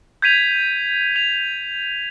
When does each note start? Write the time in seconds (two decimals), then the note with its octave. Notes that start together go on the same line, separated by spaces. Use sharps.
0.22 G6 G#6 B6 D#7 F7
1.16 F7